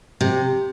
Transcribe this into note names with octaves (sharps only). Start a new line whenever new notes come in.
C3